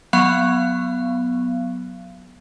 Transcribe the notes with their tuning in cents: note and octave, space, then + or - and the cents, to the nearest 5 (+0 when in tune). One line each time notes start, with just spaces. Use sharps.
F#3 -10 B3 +0 F5 -30